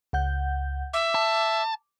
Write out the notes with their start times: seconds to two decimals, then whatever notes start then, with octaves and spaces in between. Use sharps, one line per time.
0.13 C#2 F#5 G6
0.94 E5 D6
1.15 A5